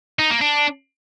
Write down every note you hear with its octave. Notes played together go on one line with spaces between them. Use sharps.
D#4
A#3
D4